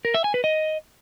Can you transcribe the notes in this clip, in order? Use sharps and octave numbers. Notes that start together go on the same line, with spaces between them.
A#4
E5
G#5
B4
D#5